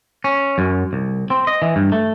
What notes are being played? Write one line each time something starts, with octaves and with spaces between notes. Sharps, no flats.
C#4
F#2
C2
C4
D#5
E3
G2
A3